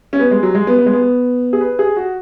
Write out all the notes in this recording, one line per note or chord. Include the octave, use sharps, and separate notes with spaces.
C#4
B3
G#3
F#3
G#3
B3
B3
G#3
B3
G#4
B4
G#4
F#4